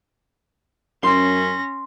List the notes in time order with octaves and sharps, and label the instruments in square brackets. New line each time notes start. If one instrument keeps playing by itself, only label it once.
[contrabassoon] F#2 [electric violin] C#4 A#6 [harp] C6